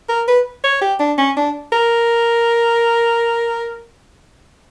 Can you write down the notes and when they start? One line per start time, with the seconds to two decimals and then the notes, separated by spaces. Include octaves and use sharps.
0.09 A#4
0.28 B4
0.64 C#5
0.81 G4
0.99 D4
1.18 C#4
1.36 D4
1.73 A#4